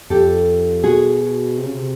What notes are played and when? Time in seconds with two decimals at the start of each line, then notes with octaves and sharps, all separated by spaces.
0.10 F2 G4 A4
0.84 B2 F#4 G#4
1.58 C3
1.66 C#3
1.74 C3